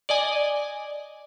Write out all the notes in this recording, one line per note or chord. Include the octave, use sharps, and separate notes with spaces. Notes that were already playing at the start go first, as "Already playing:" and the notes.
D5 D#5 G#5